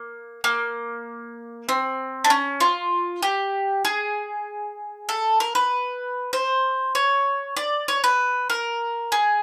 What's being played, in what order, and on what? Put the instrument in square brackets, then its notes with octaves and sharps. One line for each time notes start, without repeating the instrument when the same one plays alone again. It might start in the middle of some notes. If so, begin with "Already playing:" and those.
Already playing: [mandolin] A#3
A#3
C4
D4
C#4
F4
G4
G#4
A4
A#4
B4
C5
C#5
D5
C#5
B4
A#4
G#4